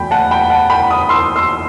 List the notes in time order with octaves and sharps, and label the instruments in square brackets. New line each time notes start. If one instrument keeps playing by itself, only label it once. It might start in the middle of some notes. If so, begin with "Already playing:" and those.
Already playing: [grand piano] E2 F#3 A3 G5 B5
F#5 A5
G5 B5
F#5 A5
G5 B5
B5 D#6
C6 E6
C6 E6